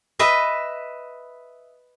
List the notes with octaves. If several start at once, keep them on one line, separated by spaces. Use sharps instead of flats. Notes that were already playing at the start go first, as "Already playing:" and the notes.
B4 D#5 E5